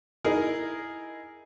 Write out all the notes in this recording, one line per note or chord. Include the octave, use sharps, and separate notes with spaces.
D#4 E4 G#4 A#4